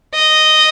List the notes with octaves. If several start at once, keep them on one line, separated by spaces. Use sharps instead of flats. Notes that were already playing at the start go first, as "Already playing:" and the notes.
D#5